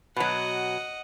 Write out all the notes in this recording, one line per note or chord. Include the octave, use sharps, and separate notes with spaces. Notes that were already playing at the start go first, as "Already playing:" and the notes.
B2 F#3 D#5 F#5